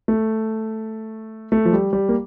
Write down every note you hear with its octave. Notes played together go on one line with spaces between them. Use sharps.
A3
A3
F3
G3
G3
A#3